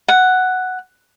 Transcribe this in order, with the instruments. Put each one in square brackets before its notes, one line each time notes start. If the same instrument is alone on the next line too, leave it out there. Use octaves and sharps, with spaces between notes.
[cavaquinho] F#5